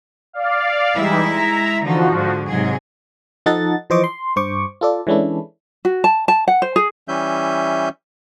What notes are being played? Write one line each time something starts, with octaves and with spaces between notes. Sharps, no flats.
D5 F5
E3 G3 G#3 D#4 E4 E5
A#5
D3 E3 F3 D#4 F#4
G#2 D3
G#2 C3 F#3 G#4
F3 D#4 A4 D#5 F#5 A6
E3 F3 C5 D#5 C#6 D6
C6
G2 C5 C#6 D6
F4 A4 D5
E3 G#3 C#4 D4 E4 A4
F#4
A5
A5
F#5
C5
G#4
E3 G3 C#4 E5 G6